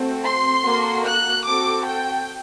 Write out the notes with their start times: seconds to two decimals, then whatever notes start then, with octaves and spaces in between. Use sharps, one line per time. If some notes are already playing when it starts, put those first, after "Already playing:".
Already playing: A3 C4 F#4 A4
0.23 C6
0.63 A#3 F#4 A4
1.05 F#6
1.45 C4 F#4 A4 D6
1.87 G5